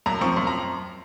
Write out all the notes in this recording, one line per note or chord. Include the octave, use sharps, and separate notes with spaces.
F#2 A#5
F3 C4 C#6
F#2 C6
A#5